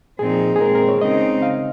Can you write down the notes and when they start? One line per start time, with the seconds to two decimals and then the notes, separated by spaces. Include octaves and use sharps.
0.19 A#2 F3 C4 D#4 G#4
0.56 G#4
0.61 A#2 G#3 C4 A#4
0.75 A#4
0.89 C#5
1.01 C#3 G#3 C4 D#4 D#5
1.42 F5